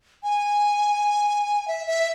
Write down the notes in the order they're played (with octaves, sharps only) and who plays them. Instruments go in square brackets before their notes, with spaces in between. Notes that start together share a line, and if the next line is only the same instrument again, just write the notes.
[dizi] G#5
E5
E5